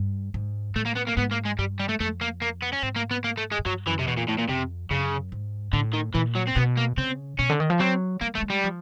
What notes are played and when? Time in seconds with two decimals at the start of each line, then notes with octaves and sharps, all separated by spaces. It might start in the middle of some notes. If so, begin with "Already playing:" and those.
Already playing: G2
0.34 G#2
0.75 A2 A3
0.85 A#3
0.96 B3
1.07 A#3
1.17 G#2 B3
1.31 A#3
1.45 G#3
1.58 G2 G3
1.80 G3
1.89 A3
2.00 F2 A3
2.21 A#3
2.42 A#3
2.62 B3
2.73 C#4
2.83 G#2 C4
2.96 A#3
3.11 B3
3.24 A#3
3.37 A3
3.51 G#3
3.59 G#2
3.66 G2 F#3
3.86 F#2 E3
3.99 C3
4.07 E2 B2
4.17 A#2
4.28 A2
4.38 A#2
4.49 F2 C3
4.90 F#2 C#3
5.32 G#2
5.73 A2 D3
5.93 D#3
6.14 A#2 E3
6.35 F#3
6.47 C4
6.56 B2 B3
6.77 A#3
6.97 C#3 C4
7.39 B2 C#4
7.50 D3
7.60 D#3
7.70 F3
7.80 F#3 C4
8.21 G3 A#3
8.35 A3
8.38 G3
8.42 G#3
8.50 G3
8.64 F3